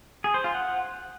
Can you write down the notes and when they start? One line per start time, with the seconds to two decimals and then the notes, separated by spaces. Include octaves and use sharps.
0.24 G#4
0.34 C5
0.44 F4
0.54 F#5